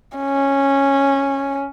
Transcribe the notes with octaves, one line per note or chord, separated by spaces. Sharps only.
C#4